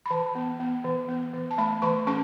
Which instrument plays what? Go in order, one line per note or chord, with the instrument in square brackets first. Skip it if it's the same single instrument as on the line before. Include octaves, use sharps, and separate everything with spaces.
[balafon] B5
E3 A5
B3
B3
E3
B3
E3
A5
A3 B5
E3 C#6
C#4 C#6